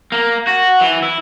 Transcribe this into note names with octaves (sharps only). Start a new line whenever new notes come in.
A#3
F#4
E3
E4